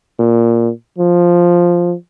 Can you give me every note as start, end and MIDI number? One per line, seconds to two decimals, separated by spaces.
0.19 0.70 46
0.98 1.94 53